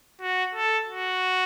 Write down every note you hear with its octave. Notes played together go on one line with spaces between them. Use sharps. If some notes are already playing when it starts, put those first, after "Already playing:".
F#4
A4
F#4